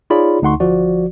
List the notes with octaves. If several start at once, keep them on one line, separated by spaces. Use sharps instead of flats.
D#4 F4 G#4 C#5 D5 B5
D2 D#4 F#5 C6 C#6
G1 F3 F#4 D5